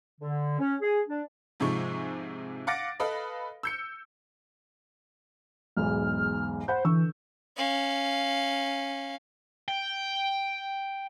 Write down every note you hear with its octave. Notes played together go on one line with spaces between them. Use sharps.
D3
C#4
G#4
D4
G#2 C3 F3 G#3 C#6
F5 F#5 D6 A6 A#6 D7
A4 B4 D#5 F5 B5
E6 G6 C#7
B1 E2 G#2 F6
C5 F#5 B5 G6
D3 E3 C#6 E6
C#4 F5
G5